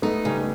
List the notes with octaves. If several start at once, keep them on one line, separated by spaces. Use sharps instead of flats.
A3 B3 D#4
C#3 G3 A3
A3